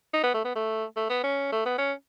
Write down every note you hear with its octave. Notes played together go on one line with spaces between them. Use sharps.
D#4
B3
A3
B3
A3
A3
B3
C#4
A3
B3
C#4